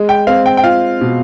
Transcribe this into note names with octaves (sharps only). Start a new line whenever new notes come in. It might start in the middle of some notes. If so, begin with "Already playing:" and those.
Already playing: G#3
G5
C4 F5
G5
G5
F4 F5
B2